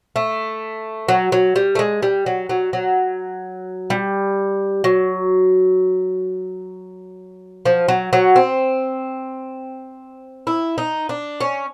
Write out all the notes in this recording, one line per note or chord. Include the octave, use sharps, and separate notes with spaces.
A3
F#3
F#3
G3
A3
G#3
G3
F#3
F#3
F#3
G3
F#3
F3
F#3
F#3
C4
E4
D#4
D4
C#4